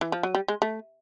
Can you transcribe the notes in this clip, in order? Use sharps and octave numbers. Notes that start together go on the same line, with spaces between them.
E3
F3
F#3
G3
G#3
A3